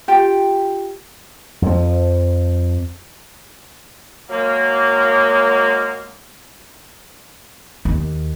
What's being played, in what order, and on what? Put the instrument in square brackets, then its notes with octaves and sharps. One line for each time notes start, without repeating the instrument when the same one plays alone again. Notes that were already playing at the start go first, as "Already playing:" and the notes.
[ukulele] F4 G4 G5
[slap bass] F2 F3
[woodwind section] F#3 G#3 A#3
[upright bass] D#2